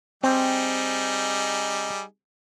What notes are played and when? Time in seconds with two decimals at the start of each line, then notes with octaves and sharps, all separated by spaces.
0.24 G3 C4 D#4 G#4